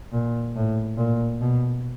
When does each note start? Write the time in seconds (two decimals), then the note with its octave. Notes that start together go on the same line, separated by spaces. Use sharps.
0.13 A#2
0.56 A2
0.98 A#2
1.41 B2